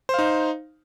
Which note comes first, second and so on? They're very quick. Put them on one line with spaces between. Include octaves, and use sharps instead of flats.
C5 F5 D#4